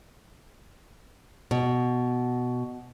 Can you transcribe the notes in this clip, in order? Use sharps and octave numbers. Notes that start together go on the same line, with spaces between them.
B2